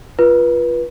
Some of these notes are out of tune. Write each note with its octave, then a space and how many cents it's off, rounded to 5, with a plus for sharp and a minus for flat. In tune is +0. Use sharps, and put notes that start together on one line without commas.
F4 -10 B4 -30